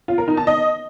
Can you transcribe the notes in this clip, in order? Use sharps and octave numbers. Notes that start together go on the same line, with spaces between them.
F4
A#4
D#4
A5
D#5